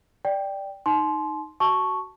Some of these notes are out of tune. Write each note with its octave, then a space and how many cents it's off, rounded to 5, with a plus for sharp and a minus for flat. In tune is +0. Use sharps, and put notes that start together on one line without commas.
D5 +0 G5 +0
D#4 +0 A5 -45 C6 +0
F#4 +15 A5 +0 C#6 -5